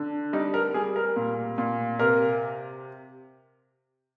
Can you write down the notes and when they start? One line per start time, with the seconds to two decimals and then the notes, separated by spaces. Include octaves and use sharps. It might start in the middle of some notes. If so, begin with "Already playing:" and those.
Already playing: D3
0.33 G3 D#4
0.54 A#4
0.74 G3 G#4
0.96 A#4
1.16 A#2
1.58 A#2
1.99 C3 A#4